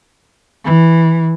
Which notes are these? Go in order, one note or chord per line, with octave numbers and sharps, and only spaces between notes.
E3